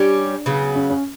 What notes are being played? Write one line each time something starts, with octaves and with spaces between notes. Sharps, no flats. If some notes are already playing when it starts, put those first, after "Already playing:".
Already playing: G3 C#4 D4 G4
C#3 F#3 B3
C#4
C#4